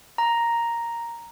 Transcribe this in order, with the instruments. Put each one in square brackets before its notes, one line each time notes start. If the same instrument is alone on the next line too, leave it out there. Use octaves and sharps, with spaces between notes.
[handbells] A#5